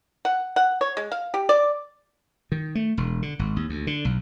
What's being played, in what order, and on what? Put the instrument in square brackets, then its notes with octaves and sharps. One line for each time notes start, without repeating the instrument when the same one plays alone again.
[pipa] F#5
F#5
C#5
G#3
F5
G4
D5
[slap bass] D#3
A3
E1
D3
G#1
D#2
D2
D3
B1